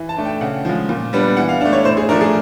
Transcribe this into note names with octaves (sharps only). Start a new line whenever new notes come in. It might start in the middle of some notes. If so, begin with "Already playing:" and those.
Already playing: E3
A5
A3 D4
G5
C#3 F#5
F3 G#3
A#2
G3 B3 D4
E3 F#5
F5
A3 D4
C#5
A2 C5
G#4
F3 A3 D4 A#4
G#4